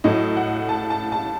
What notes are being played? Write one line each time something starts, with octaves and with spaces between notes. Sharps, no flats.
A2 F#3 A3 D#5
F#5
A5
A5
A5